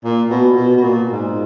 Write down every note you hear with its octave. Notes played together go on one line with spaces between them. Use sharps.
A#2
B2
B2
B2
A#2
G#2